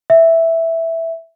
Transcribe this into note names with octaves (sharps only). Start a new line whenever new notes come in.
E5